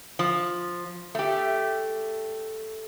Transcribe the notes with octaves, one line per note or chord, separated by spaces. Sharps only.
F3
A3 G4